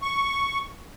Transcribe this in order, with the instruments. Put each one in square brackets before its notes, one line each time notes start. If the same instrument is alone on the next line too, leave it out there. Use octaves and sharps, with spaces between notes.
[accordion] C#6